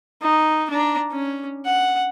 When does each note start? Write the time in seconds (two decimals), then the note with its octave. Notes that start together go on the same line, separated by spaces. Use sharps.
0.22 D#4
0.70 D4 A#5
1.12 C#4
1.65 F#5